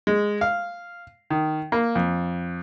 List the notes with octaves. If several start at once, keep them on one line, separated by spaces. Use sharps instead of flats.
G#3
F5
D#3
A#3
F2